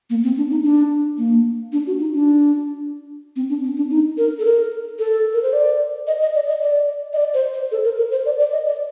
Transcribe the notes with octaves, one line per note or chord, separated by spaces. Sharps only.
A#3
C4
D4
D#4
D4
A#3
D4
F#4
D#4
D4
C4
D4
C4
D4
D#4
A#4
A4
A#4
A4
A#4
C5
D5
D#5
D#5
D5
D#5
D5
D#5
D5
C5
C5
A4
A#4
A#4
C5
D5
D5
D#5
D5